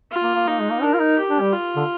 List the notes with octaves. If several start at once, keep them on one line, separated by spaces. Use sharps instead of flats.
F4
A#3
A#3
A#3 D#4
G#3
A#3
D4 A#4
F4
D#4
G4
D4
G3
F4
D3